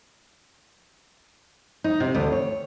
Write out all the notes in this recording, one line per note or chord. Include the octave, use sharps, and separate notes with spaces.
D#4
C3
D2
C#5